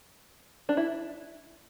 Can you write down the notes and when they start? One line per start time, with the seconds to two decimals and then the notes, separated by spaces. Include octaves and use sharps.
0.69 D4
0.77 E4